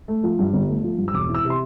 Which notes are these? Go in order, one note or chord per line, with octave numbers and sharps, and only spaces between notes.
A3
F3
G2
G1
A3
F3
G2
E6
E1 D6
E3
E6
C3
C6